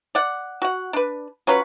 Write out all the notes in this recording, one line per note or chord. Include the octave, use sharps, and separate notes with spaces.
D5 F#5
F#4 F#5
D4 B4
F#3 C#4 F4 B4